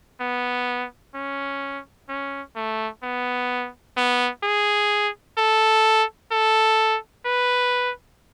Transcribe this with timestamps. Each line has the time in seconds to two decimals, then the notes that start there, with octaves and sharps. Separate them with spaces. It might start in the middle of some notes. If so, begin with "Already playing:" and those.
0.21 B3
1.15 C#4
2.09 C#4
2.56 A3
3.04 B3
3.97 B3
4.44 G#4
5.38 A4
6.32 A4
7.26 B4